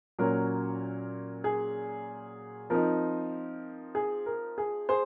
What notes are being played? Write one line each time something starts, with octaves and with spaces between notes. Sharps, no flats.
A#2 F#3 C#4 A#4
G#4
F3 C4 D#4 A#4
G#4
A#4
G#4
G#4 C5